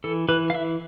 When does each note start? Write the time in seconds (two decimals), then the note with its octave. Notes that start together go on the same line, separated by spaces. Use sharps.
0.04 E3 A4
0.28 E3 B4
0.50 F5
0.54 E3 E5